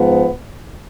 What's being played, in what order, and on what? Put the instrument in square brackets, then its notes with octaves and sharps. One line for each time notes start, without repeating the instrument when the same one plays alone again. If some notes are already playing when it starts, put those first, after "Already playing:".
Already playing: [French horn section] G#2 F3 B3